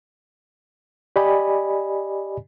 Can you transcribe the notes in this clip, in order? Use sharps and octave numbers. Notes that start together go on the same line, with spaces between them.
G4 D5 D#5 G#5 B5